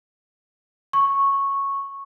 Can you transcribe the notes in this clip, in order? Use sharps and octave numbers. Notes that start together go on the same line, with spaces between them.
C#6